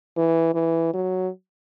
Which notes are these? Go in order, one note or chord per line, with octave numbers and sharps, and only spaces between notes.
E3
E3
F#3